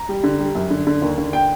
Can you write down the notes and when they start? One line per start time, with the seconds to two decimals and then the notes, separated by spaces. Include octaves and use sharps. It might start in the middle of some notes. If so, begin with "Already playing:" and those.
Already playing: A#5
0.09 G3
0.24 D3
0.40 G3
0.55 F#2
0.70 D3
0.87 D3
1.02 D#2
1.18 D3
1.33 G5